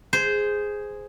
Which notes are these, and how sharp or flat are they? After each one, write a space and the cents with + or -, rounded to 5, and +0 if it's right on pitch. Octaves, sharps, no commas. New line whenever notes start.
G#4 +0 C5 -10